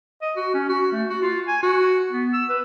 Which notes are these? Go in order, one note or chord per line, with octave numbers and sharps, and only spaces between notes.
D#5
F#4
C#4
F#4
A3
F#4
F4
G#5
F#4
B3
E6
B4